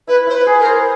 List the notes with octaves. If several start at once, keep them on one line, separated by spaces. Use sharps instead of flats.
E4 B4
E4 C5
B4
G#4
A#4
C5